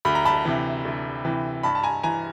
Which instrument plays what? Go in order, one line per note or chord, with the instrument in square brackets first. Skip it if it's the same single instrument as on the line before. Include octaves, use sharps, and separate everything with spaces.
[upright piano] D2 B5
A#5
A5 B5
C3 E3
D2
C3 E3
G2 A5 B5
A5
G#5 A#5
E3 G#5 A#5